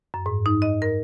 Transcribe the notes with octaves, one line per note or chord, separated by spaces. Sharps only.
F#2
G#2
D#4
D#5
A#4